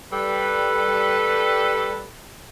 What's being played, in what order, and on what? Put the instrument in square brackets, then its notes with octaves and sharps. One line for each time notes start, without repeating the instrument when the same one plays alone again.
[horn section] G3 A4 B4